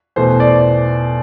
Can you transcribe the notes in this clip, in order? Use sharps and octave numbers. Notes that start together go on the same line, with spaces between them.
E2 B2 A3 C5
D5